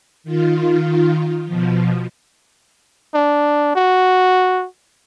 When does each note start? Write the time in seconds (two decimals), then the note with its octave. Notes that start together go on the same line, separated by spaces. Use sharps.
0.24 D#3 F4
1.46 B2 F3
3.14 D4
3.75 F#4